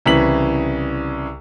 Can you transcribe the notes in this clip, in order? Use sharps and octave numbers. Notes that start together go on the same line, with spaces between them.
C2 C#3 E3 B6 F#7